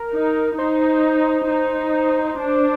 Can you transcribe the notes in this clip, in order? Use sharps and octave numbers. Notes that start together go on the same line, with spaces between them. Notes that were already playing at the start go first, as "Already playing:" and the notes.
Already playing: A#4
D#4
D#4 C5
D#4
D4